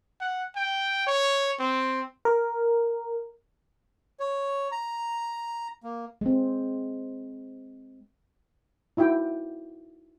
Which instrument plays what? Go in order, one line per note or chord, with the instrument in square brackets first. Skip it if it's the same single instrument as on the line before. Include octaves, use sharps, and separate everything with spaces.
[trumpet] F#5
G5
C#5
C4
[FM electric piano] A#4
[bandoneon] C#5
A#5
A#3
[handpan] G#3 C4
[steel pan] D#4 E4 F#4 G5